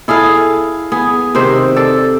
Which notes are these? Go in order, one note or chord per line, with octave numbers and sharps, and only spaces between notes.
E4 G#4 A4 F5
B3 G#4
C3 D#3 C5
A4 D5